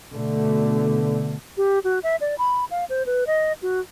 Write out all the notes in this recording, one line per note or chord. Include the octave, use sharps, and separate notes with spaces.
B2 D3 A3
G4
F#4
E5
D5
B5
F5
C5
B4
D#5
F#4